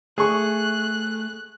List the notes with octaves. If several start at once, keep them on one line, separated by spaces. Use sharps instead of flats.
A3 G#4 C#6 F#6